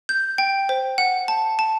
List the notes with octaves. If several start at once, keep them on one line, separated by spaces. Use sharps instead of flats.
G6
G5
C5
F#5
A5
A5